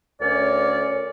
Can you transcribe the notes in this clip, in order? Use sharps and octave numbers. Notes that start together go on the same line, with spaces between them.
D2 C#4 A#4 C#5 D5